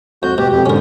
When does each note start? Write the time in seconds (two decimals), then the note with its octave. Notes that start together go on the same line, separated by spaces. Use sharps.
0.23 F2 F#4 G6
0.38 B2 G4
0.51 F2 G4
0.66 G#2 D3 C#4 A#4